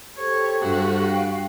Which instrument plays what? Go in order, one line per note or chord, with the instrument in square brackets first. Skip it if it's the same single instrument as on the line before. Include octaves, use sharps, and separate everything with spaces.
[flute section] G4 A4 C5 [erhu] C#5
[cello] G2 [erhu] F#4
[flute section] F5 G5